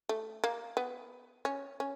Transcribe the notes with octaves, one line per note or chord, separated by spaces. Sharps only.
A3
A#3
B3
C#4
C#4